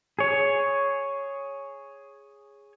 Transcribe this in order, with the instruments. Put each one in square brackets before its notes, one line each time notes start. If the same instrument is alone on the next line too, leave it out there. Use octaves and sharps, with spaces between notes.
[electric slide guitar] G#4 C#5